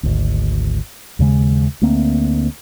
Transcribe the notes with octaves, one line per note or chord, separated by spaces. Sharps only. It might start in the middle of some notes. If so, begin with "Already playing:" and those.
G#1 D2
D#2 C#3 G#3
D2 A3 A#3 C4